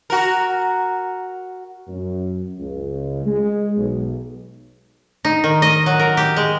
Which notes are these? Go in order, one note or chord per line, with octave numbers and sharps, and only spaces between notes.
F#4 A#4
F#2
C#2
G#3
B1
D#4
D#3
D#5
F#3
A#4
G4
G#3